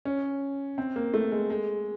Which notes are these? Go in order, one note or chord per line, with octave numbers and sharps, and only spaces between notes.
C#4
C4
A#3
A3
G#3
G#3